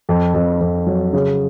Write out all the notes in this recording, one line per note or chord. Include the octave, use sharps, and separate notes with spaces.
F2
F2
F2
F#3
C#3